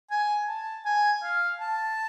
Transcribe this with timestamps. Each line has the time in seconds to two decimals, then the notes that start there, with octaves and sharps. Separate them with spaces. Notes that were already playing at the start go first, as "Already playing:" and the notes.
0.11 G#5
0.48 A5
0.85 G#5
1.23 F5
1.60 A5